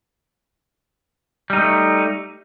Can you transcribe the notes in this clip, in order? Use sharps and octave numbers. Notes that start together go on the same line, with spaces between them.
G3 A3 D#4